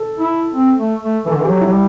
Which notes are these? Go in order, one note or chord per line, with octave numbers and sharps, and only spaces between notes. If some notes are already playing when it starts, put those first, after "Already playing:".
Already playing: A4
E4
C4
A3
A3
E3 A4
D3
E3
G4
F#3
E4
F#3
G3